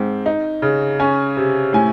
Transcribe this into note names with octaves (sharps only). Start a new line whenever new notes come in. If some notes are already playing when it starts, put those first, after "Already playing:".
Already playing: G#2 C4
D#4
C#3
C#4 G#5
C3
A2 G#5